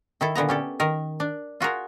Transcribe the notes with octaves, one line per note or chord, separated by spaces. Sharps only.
D#3 E4 A4
A#2 D3 B3 A#5
C#4 G4 A4
D#3 A#4
D4
F4 F#4 G#4 A#4